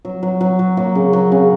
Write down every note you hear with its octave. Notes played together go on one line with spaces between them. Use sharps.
F#3
F#3
F#3
F#3
F#3 A#3
C#3
F#3
C#3